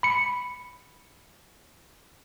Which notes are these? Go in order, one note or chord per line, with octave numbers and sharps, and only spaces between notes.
B5 C#7